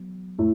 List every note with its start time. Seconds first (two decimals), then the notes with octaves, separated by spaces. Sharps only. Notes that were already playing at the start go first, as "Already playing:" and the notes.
Already playing: F#3 B3
0.39 A2 A3